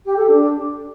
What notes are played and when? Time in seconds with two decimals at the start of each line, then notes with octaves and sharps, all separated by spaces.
0.05 G4
0.16 A4
0.27 D4